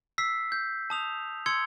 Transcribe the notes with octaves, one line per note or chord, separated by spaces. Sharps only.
E6 B6 C7
G6
A5 D#6 F7
C6 E6 G#6 C#7 G7